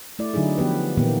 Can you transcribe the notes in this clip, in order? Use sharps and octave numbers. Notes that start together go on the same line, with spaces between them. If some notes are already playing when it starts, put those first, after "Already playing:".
A3 E4 D5
D3 F#3 D#4 E4 G#4
F3 B3 G4 B4
A#2 D#3 E3 A#3 B3 G4